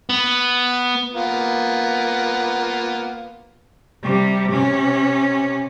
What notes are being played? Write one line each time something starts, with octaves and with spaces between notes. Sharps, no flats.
B3
A#3 B3 F4
C3 G3
C3 C#4